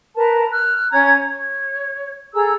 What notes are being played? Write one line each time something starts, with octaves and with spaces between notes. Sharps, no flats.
A#4 B4 A5
F6 F#6
C#4 A#5 G#6
C#5
G#4 A4 A#5 E6